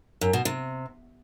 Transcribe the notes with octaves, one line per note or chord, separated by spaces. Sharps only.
F#2
B2
C3